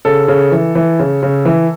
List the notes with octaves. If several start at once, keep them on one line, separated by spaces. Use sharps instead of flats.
C#3 A4
C#3
E3
E3
C#3
C#3
E3